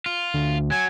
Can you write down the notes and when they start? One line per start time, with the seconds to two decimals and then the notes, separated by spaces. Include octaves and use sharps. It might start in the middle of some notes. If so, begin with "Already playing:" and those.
0.06 F4
0.34 D2
0.71 F#3 G#5